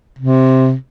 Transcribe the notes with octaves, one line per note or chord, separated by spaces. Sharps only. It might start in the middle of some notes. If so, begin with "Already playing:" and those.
C3